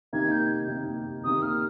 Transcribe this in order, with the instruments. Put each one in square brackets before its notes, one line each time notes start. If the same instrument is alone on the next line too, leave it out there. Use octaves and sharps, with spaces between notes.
[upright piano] C3 D#3 A#3 D#4 [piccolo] G#6
[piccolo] G6
[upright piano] C3 D#3 A#3 D#4
[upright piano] C3 D#3 A#3 [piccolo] D#6
[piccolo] F6